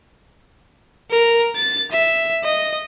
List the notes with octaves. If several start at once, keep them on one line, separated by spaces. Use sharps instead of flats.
A#4
A6
E5
D#5